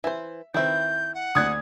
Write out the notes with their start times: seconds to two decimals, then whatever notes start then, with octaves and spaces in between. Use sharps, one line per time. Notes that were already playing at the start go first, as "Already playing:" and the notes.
0.04 E3 C5 E5
0.54 D#3 C4 E4 B4 E5 G6
1.15 F#5
1.35 D2 D4 D#6 F#6 G#6